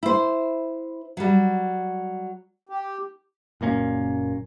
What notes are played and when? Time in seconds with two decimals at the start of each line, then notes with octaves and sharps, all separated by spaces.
0.03 E4 C5
1.17 F#3 G3
2.69 G4
3.61 F#1 A#2 A#3 C#4